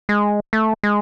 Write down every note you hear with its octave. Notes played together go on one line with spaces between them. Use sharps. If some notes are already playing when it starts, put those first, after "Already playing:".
G#3
A3
G#3